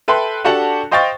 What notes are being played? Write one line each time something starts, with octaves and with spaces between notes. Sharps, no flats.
A4 B4 E5 G5 B5 C6
D4 F#4 G4 A4 F#5 A5
C5 D#5 F5 G5 C#6 A6